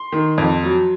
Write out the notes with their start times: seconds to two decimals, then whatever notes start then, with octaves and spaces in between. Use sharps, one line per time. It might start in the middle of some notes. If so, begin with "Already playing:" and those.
Already playing: C6
0.12 D#3
0.38 F2
0.63 F#3